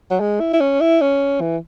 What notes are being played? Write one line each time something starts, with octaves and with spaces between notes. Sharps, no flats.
F#3
G#3
E4
E4
C#4
E4
C#4
E3